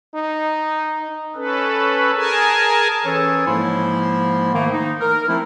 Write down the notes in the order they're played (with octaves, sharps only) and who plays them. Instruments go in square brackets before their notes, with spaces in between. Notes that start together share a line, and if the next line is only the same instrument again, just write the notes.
[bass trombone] D#4
[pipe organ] C#4 A4 B4
G#4 A#4 G#5 A5
[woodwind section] E3 C#4 G#4 A4 C#5
G#2 F3 G#3 A#3 E4 C6
D#3 A3 A#3
D#4
A#4
F3 A3 C4 E4